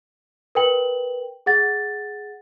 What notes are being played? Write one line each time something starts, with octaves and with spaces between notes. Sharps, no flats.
A#4 B4 G5 F#7
G#4 F#5 A6